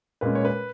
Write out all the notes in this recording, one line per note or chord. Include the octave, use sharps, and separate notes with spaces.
A#2 G#3 C#4 B4
C#5
B4